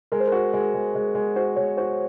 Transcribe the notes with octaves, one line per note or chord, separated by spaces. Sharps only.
G#3 A#4
C5
F#4 A#4
G#3
G#3
G#3
G#3
F#4 C5
G#3 C#5
F#4 C5